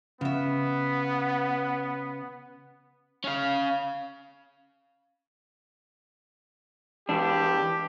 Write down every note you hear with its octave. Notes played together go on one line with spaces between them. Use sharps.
C#3 B3 E5
C#4 F5
E2 D4 G4